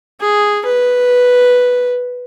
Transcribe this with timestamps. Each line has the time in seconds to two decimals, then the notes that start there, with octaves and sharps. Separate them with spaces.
0.21 G#4
0.66 B4